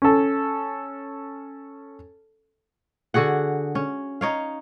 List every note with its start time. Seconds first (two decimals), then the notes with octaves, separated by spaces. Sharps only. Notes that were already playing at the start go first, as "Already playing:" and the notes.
0.02 C#4 A4
3.14 D3 F#4 G#4 F#5
3.75 C#4
4.21 D#4 C#5 F5